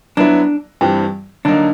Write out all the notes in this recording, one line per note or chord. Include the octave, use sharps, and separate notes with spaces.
F#3 B3 D4 E4
G2 E3 G3 C4
D3 F#3 A#3 D4 D#4